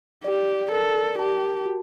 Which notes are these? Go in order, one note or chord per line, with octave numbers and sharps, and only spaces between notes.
G4 D5
A4 A#4
G4 A5
F#4